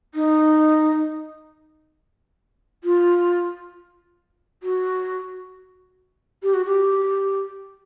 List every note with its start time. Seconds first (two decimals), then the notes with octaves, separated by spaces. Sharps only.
0.15 D#4
2.84 F4
4.63 F#4
6.43 G4
6.54 F#4
6.66 G4